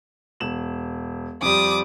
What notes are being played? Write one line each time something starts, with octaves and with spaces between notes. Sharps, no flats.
E1 E7 F#7
F2 G3 D6 D#6